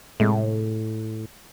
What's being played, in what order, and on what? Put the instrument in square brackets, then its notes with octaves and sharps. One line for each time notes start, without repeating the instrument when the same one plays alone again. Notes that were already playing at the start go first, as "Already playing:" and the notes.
[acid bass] A2 [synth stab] C3 G#3 A3